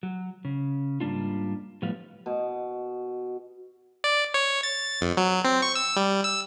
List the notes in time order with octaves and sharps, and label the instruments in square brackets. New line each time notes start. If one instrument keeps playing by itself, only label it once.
[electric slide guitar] F#3
C#3
G#2 G3 A#3 D4 F4
A2 F3 G3 B3 F5
[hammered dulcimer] B2
[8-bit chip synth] D5
C#5
A6
F2
F#3
C4
C#6
E6
G3
E6